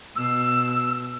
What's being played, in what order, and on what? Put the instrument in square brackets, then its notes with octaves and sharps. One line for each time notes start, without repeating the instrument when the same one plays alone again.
[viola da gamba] B2 [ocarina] E6